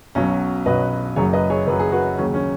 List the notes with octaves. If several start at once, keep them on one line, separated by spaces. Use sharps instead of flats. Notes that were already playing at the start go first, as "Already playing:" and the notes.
B1 B2 F#3 C#4
B1 B2 F#3 B4 D#5
F#1 F#2 F#3 G#4 C#5
B4 D#5
G#4 C#5
F#1 F#2 F#3 B4
G#4
F#4 B4
D#2 C#3 F#3 C#4
C#4